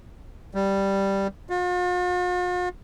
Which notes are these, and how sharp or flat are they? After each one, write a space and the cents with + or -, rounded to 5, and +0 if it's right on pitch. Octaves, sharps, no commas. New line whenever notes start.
G3 +0
F4 +45